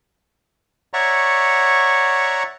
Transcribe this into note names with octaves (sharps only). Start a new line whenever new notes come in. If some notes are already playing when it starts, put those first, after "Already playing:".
C#5 D5 E5 F#5 A#5 C#6